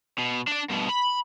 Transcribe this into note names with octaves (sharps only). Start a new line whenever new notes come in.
B2
D4 D5
G2 B2
B5